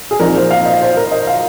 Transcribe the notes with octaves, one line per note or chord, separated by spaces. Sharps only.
G#4
A#1 A#2 F3 C4 D#4 A#4
C5
F5
D#5
C5
A#4
D#5
F5